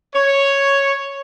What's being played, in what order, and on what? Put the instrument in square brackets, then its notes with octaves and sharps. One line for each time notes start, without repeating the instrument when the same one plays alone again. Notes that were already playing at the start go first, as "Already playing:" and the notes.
[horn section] C#5